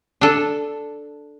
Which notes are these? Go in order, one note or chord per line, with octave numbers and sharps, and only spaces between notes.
D4 A4